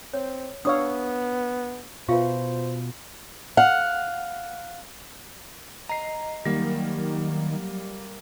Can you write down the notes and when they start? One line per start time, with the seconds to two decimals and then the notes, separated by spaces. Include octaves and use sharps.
0.14 C4 C#5
0.65 B3 D4 C#5 F5 D#6 E6
2.09 B2 F4 B4 C5 E5 F5 C#6
3.57 F5 F#5
5.89 D#5 A#5 C7
6.46 D#3 F#3 G3 A#3